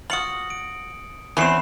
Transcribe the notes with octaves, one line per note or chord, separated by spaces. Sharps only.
F4 F#4 D#6 C#7 F#7
D7
E2 C4 C#4 E4 B5 C7 E7